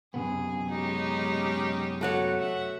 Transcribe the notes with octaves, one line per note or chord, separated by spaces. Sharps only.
F#2 C3 B3 G#4
G#3 C#4 D#4 G4
A3 F#4 C#5
E5 F#5